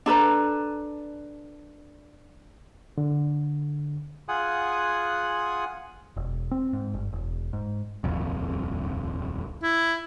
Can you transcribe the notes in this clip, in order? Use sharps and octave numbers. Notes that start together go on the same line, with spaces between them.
D4 A4 B4 A#5
D3
F4 G#4 F#5 G#5 D#6 F#6
E1
C4
G#2
G1
E1
G#2
D#1 C2 F2
E4